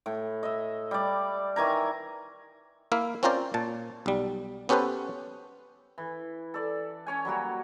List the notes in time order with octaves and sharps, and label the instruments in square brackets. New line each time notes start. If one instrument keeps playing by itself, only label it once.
[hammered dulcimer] A2
D#5 E5
G3 D5
D#3 E3 G#5 A#5
[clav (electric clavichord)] A#3 E4 E5 F5
C4 C#4 F4 A#4 C5 D5
A#2 A5
B1 G3
B3 C#4 G4 A4 B4 C5
[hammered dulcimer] E3
A4 D5
C#4 C#5 G#5
F#3 G3 A#3 F#4